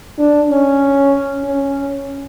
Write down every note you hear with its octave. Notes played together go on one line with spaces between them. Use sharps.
D4
C#4
C#4